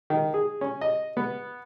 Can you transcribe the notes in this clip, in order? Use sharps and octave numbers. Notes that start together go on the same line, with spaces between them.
D#3
G#4
C#4
D#5
B3